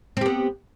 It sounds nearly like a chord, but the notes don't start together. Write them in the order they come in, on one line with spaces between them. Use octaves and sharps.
C4 G4 B3